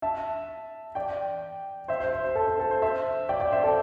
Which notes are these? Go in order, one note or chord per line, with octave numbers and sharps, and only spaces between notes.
E5 A5
D5 G5
C5 E5
C5
C5
C5
A4
C5
A4
C5
C5 E5
D5 G5
D5 G5
C5 E5
A4 D5